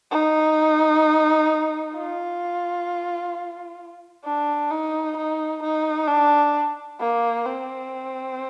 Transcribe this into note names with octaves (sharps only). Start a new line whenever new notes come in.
D#4
F4
D4
D#4
D#4
D#4
D4
A#3
C4